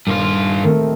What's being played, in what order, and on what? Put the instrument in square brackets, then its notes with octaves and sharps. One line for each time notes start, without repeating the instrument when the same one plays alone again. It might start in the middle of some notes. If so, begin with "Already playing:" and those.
[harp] D#1 F6 [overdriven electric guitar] G2 F4
[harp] D#3 A3 C4